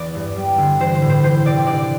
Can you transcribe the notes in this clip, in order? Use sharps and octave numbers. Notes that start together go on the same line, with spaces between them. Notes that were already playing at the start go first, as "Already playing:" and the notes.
Already playing: E2 E3 D5
G2
G3
D3
E3 C5
C5
A2
C5
E3 C5
C3 D5
D3 D5